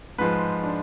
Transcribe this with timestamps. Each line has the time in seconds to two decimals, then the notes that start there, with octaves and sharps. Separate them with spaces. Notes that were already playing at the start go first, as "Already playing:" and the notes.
0.18 G#2 F3 G#3 B4
0.64 D4